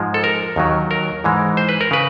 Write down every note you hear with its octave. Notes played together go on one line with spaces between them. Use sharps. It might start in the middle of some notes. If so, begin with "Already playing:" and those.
Already playing: G#2 F3 G#3
A4
A#4
D#2 D#3 F#3
A#4
G#2 E3 G#3
C5
B4
A#4
C#3 B4